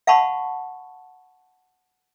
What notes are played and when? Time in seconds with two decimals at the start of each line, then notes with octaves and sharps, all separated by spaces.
0.07 F5 F#5 A5 B5 C#6